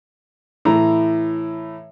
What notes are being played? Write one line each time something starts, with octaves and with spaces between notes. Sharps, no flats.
A2 E3 A#5